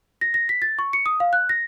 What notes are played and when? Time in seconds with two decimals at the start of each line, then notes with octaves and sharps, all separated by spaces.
0.21 A#6
0.34 A#6
0.49 B6
0.62 A6
0.79 C#6
0.93 C#7
1.06 D#6
1.20 F5
1.33 F#6
1.49 A#6